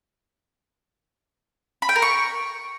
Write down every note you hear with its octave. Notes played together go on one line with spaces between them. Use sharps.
B5
G5
A#4
C#6